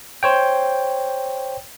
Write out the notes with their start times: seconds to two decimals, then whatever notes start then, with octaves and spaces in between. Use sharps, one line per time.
0.23 C5 C#5 G5